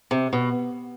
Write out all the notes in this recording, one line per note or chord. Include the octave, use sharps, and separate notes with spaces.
C3
B2